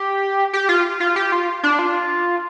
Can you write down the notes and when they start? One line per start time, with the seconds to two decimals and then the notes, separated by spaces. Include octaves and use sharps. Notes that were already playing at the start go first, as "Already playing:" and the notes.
Already playing: G4
0.53 G4
0.69 F4
1.00 F4
1.16 G4
1.32 F4
1.63 D4
1.79 F4